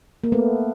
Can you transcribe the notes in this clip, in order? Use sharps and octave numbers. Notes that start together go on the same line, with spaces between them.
A#3
A3 B3